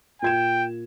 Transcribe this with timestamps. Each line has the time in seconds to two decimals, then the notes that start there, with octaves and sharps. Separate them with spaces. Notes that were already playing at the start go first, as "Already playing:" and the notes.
0.22 A#2 G5 G#6 E7